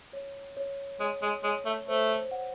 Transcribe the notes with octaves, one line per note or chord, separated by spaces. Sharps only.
C#5
C#5
G#3 C#5
G#3
G#3 C#5
A3
A3 C5
F#5